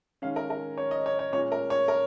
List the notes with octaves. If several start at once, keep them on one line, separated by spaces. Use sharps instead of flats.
D#3 G#3 C#4 F5
A#4
A#4
C#5
D#5
C#5
C#5
A#2 G#3 C#4 C#5
A#4
C#5
A#4